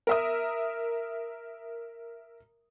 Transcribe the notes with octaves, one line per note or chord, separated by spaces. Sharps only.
A#4 E5 D#6